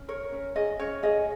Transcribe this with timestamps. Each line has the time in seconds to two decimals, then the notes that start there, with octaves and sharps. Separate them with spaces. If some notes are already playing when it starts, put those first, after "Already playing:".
Already playing: C#4
0.08 A#4 C#5
0.32 C#4
0.56 G#4 D#5
0.80 C#4 C#5
1.03 G#4 D#5